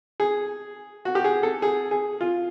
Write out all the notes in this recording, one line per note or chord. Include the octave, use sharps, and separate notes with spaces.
G#4
F#4
G4
G#4
A4
G#4
G#4
F4